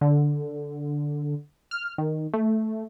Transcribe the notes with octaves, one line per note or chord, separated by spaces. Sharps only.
D3
F6
D#3
A3